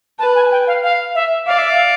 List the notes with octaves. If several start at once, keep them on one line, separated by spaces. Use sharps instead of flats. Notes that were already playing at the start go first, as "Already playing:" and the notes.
B4 A5
G#5
G5
F5
F5
E5
D5 F5
E5
F5